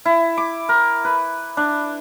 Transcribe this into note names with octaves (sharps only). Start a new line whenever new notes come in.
E4
D6
A#4
B4
D4